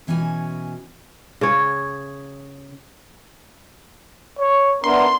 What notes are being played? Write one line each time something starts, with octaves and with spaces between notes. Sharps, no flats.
B2 E3 C#4 F#4 G#5
C#3 C#5
C#5
B3 D4 E4 A#4 C6